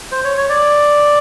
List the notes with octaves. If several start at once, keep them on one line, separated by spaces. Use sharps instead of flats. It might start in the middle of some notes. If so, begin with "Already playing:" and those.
C5
C#5
C#5
D5